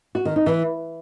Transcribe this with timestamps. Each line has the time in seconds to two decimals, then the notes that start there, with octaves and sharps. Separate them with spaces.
0.15 F#4
0.25 D#3
0.36 D#4
0.46 E3